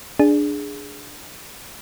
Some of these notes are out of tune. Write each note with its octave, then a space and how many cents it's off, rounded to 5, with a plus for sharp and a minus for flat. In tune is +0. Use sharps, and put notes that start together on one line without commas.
D4 +0 G#4 +0